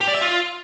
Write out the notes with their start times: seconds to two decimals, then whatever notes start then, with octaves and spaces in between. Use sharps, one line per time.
0.01 G4
0.08 D5
0.14 E5
0.21 F4